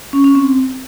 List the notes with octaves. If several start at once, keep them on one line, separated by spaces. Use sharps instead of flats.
C#4
C#4
C4